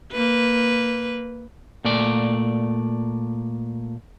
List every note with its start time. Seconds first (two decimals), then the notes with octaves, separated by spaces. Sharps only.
0.13 A#3 B4
1.85 A#2 A3 D5